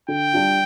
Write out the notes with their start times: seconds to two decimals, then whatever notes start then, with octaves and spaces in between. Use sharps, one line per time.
0.08 D3 G5
0.33 G3 D4 F4